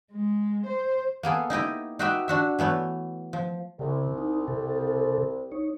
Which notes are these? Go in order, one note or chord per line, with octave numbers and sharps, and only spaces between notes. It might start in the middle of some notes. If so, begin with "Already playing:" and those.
G#3
C5
A#3 B3 G#4 A4
D#4 E4 G4 D#5
D#4 F#4 G4 B4 E5 G5
D4 F#4 E5
E3 A3 B3 C#5
F3
C2 C#3
D#4
C3 A4
D#4 C#5